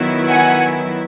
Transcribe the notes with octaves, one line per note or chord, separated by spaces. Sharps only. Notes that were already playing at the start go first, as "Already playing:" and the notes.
Already playing: D#3 F#3 B3 E4
F#5 G#5